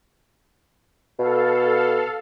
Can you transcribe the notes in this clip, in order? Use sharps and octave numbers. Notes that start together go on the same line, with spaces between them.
B2 A4 F5